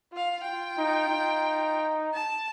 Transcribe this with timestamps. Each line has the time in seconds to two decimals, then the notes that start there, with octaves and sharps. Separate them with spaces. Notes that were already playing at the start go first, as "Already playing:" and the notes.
0.12 F4 F5
0.43 F4 G5
0.78 D#4
1.09 D#4
2.14 A5